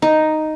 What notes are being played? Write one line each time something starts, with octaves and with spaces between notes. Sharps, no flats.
D#4